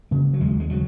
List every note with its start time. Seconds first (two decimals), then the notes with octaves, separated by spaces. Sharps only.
0.11 C#3 A#3
0.33 F#3
0.41 D#2 G#3
0.60 G#3
0.70 C#3 F#3